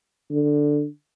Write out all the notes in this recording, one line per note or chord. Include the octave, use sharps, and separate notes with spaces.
D3